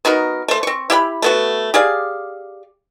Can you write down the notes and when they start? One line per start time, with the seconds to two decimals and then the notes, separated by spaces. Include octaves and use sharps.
0.05 B3 D#4 F#4 A#4
0.48 A3 C5
0.63 C4 C#6
0.90 E4 G4 F#5 B5
1.22 A3 B3 F#4
1.74 G4 G#4 D5 F5